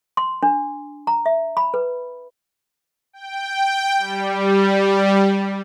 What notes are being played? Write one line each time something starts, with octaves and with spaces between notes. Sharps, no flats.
C6
D4
A#5
E5
B5
B4
G5
G3